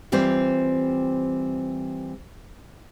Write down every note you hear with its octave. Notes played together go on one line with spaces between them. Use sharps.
E3 G3 C4 F4 G4 C5